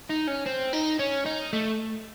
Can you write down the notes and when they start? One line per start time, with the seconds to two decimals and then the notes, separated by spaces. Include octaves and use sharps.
0.09 D#4
0.27 C#4
0.46 C4
0.73 D#4
0.99 C#4
1.26 D#4
1.53 A3